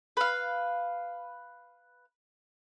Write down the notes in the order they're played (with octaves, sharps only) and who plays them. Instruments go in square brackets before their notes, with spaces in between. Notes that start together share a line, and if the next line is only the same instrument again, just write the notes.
[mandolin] B4 F5